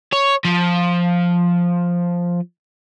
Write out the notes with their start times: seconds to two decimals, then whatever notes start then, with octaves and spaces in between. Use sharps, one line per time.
0.12 C#5
0.45 F3